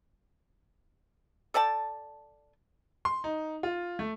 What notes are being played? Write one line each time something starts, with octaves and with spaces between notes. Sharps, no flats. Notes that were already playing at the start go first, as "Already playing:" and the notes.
A4 D5 G5 A5
C6
D#4
F4
A3